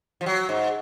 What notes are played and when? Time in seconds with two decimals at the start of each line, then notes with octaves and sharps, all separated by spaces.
0.21 F3
0.26 F#3
0.49 G#2